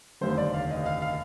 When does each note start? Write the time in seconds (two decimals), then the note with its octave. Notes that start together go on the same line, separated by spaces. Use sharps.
0.21 F1 D#2 D3 C5
0.38 D5
0.54 F5
0.71 D#5
0.86 F5
1.02 F5